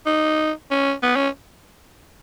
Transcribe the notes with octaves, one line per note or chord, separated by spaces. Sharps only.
D#4
C#4
B3
C#4